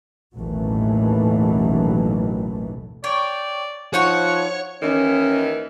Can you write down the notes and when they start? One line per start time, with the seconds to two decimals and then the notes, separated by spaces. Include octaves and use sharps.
0.36 A1 D#2 B2 E3 F#3 A3
3.04 C#5 D5 G5
3.94 F3 D#4 F#4 C#5 F#5 C#6
4.82 D#2 D#3 E3 C#4